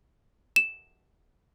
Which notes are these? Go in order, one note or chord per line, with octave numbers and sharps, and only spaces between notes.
E7